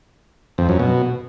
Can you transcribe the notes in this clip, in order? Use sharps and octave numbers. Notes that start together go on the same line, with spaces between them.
F2
F#2
B2